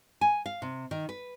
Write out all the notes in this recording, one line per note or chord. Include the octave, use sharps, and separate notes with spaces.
G#5
F5
C3
D#3
B4